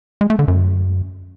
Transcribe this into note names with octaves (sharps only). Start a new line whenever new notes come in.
G#3
A3
D3
F#2